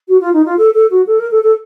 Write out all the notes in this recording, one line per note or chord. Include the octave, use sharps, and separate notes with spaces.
F#4
F4
D#4
F4
A4
A4
F#4
A4
A#4
A4
A4